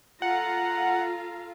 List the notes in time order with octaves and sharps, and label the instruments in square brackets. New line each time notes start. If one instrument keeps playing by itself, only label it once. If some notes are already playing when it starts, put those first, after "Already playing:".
[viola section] F4 A4 F5 [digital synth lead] F#5 [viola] A#5